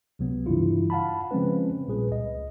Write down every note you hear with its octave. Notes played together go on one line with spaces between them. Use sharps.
C#2 C3 F#3 B3
G2 C#3 E3 E4 F4
F5 F#5 A5 B5
C#3 F3 G#3 C4 C#4 B4
A#1 A#2 G3 G#4 B4
C#2 D#5